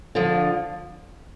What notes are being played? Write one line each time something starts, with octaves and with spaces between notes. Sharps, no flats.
D3 F3